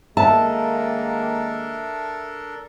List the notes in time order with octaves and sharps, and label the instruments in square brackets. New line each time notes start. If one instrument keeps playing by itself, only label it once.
[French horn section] D#3 G#3 A#3 [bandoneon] D4 A4 A#4 [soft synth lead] E5 [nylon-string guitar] A5